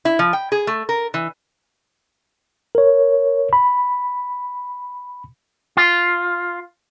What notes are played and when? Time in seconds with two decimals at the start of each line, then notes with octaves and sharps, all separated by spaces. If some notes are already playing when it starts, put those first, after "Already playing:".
0.05 E4
0.19 F3
0.33 G5
0.52 G#4
0.67 A3
0.89 A#4
1.14 E3
2.75 A#4 C#5
3.53 B5
5.77 F4